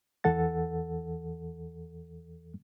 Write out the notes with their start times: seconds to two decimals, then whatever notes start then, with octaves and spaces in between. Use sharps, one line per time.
0.24 E2 E3 A4 F#5 A6